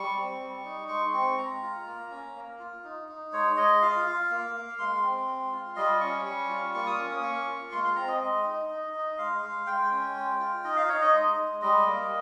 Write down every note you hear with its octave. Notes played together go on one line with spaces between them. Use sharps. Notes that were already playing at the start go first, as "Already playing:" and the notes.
Already playing: G3 C#6
C4
G3
D#4
G#3 C#6
C6
C4 C#6
G#3 A#5
F4
A#3
C#4
A#3
F4
D#4
D#4
G#3 C#5
G#3 D#5
F4 F5
F4
A#3
A#3
G#3 C6
C4
G#3
F4
G3 D#5
C#4 C#6
G3 C#6
F4
A#3 C#6
D#6
C#4 C#6
D#6
A#3 C#6
F4
G#3 C6
C6
C4 A#5
D#5
G#3 D#5
D#4
D#4
D#4
G#3 F5
G#3
G#3 G5
C#4
G#3
F4
D#4 D#5
F5
D#4 C#5
D#5
G#3
G#3
G3 D#5
A#3